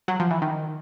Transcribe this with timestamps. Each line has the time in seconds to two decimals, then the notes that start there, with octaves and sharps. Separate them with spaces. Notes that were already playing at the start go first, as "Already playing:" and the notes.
0.08 F#3
0.20 F3
0.31 E3
0.42 D#3